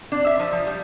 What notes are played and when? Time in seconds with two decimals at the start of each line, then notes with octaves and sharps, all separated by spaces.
0.12 D4
0.27 E5
0.39 F3
0.52 F3
0.67 G3